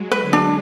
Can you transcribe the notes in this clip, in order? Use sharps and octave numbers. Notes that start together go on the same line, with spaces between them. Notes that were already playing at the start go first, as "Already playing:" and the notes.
Already playing: F#3 G#3
B4
D3
D4